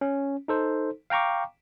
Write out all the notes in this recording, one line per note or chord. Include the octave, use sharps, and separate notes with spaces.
C#4
D#4 A4 C5
F5 G5 A#5 C#6 D6